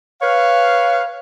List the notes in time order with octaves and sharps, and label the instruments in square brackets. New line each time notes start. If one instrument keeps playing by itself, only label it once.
[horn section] B4 C#5 F5